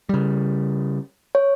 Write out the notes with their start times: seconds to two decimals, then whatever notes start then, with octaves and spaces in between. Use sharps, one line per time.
0.09 C#3 G3
1.35 C#5